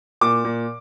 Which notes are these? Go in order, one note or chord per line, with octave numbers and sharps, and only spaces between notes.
A#2 D6
A#2